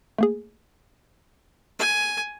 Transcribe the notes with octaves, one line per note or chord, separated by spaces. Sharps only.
A3 A#3 G#4
G#5